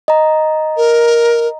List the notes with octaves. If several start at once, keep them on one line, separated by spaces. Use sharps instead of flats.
D#5 A#5
A#4